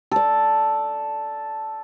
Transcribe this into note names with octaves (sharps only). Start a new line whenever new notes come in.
A4 D5